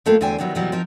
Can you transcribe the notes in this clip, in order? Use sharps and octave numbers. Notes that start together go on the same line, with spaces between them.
F2 D#3 A3 A#3 F4 F5
E2 D3 F#3 C5 G5 G#5
D#3 E3 F#3 G3 B3 D4
F2 B2 E3 F#3 G3 B3
F3 C4 D#4 A#4